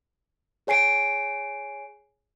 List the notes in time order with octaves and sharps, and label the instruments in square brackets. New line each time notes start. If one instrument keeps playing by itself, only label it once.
[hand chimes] G#4 C#5 G#5 C7 D7